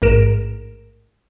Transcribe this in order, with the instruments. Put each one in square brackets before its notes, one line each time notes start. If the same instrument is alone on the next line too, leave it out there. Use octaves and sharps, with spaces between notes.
[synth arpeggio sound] A1 G#2 A#4 D7 E7